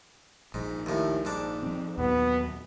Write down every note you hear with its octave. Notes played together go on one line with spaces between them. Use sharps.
A#1 G#2
D#2 A2
G#2 D4
F3 C4
D#2 A#2 F#3 B3